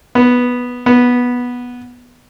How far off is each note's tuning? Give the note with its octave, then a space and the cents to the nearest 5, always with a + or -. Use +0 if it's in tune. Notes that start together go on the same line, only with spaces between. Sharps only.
B3 -5
B3 -10